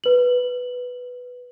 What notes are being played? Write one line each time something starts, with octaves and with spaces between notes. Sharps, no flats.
B4 F#7